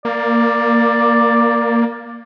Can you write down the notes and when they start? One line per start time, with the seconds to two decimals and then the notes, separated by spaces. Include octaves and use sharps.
0.05 A#3 D5